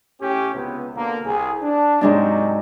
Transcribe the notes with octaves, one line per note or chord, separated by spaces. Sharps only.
A2 C#4 G4
C#2 C3 B3
B2 D3 A#3
C2 G#4
D4
G#2 C3 F#3 G#3 D4